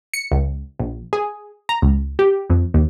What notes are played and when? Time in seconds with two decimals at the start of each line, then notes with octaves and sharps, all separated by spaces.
0.14 C#7
0.32 C#2
0.79 A#1
1.13 G#4
1.69 A#5
1.82 C#2
2.19 G4
2.50 F2
2.74 D#2